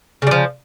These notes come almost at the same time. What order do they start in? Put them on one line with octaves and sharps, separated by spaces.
C#3 G3 F3